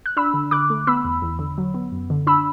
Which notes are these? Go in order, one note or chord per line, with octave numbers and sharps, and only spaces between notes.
F#6
D4 B5 E6
D3
D3 D6 F#6
A3
B3 B5 E6
E2
E2
D3
F#3
B3
F#2
D3
D4 B5 E6